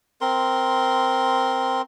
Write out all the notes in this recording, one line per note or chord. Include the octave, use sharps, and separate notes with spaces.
C4 A#4 C6